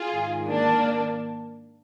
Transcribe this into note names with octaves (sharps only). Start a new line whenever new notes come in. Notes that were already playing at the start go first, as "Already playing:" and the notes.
Already playing: F4 G#4
G#2 D#3
A#3 D4